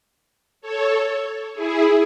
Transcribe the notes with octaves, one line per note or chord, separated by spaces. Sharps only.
A4 C#5
E4 G#4